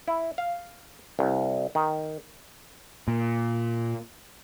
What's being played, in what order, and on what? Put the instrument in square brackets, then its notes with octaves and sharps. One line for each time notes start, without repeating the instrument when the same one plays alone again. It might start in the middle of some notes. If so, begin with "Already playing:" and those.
[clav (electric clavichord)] E4
F5
C2
D#3
[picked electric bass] A#2